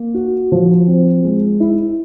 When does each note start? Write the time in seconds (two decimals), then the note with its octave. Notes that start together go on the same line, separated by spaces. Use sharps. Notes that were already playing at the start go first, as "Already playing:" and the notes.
Already playing: A#3
0.14 F#4
0.52 F3
0.87 C4
1.24 G#3
1.60 E4